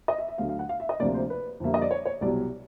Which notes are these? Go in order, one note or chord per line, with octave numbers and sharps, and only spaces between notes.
D#5
E5
E5
D2 D3 F#3 F5
F5
F#5
F5
E5
D#5
D2 C3 F3 A#3 D4 D5
C5
B4
F2 D3 G3 A#3 E5
D#5
D5
C#5
C#5
C2 B2 F#3 D5